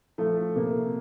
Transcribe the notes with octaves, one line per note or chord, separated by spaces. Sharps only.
F3 A3
C3 A#3